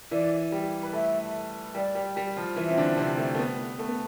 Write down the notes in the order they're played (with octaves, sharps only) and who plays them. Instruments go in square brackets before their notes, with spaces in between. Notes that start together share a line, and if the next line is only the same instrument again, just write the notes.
[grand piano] E3 E4 [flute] D5
[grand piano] G3 G4
B4
[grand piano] A3 A4 [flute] E5
[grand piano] G3 G4 [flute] D5
[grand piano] G3 G4
G3 G4
F3 F4
[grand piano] E3 E4 [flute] E5
[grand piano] C4
D3 D4
C3 C4
A3
A3
B3
A3
B3